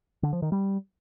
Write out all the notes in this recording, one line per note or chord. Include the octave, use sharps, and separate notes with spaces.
D3
F3
D#3
G3